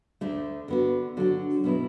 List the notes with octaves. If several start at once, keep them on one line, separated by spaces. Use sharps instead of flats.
D2 D3 A3
D3 B3 F#4
D3 F#3 D4 F#4
B2 F#3 B3 E4